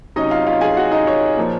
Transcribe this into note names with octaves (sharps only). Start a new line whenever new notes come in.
C3 F#3 C#4 D#4 D#5
F4 F5
F4 F5
G#4 G#5
F#4 F#5
D#4 D#5
C#5
A#2 F3 A#3